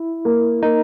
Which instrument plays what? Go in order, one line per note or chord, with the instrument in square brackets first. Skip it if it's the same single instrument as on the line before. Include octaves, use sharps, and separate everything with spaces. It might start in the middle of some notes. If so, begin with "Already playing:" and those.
Already playing: [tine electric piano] E4
[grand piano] A#3
[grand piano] A#3 [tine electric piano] D#4